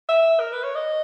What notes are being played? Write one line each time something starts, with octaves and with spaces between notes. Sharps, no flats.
E5
A#4
B4
C#5
D#5